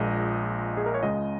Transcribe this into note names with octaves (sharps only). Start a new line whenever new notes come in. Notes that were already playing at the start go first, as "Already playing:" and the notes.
Already playing: A#1 A#2 G#3 D#5
G#4
A#4
C#5
C#2 C#3 G#3 D#5